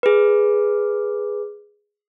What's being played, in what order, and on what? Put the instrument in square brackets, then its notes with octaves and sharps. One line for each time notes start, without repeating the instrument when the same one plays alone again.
[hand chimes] G#4 B4